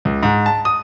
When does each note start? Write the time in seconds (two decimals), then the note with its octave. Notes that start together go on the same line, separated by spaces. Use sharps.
0.05 C#2
0.23 G#2
0.46 A5
0.65 D#6